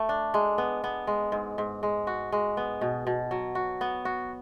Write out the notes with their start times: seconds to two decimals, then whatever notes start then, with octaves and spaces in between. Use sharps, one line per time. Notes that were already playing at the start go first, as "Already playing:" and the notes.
Already playing: A3
0.09 D4
0.34 G#3
0.58 B3
0.84 B3
1.07 G#3
1.32 G#2
1.58 G#2
1.83 G#3
2.07 F#4
2.32 G#3
2.57 B3
2.81 B2
3.07 B2
3.31 F#3
3.55 F#4
3.81 B3
4.05 F#4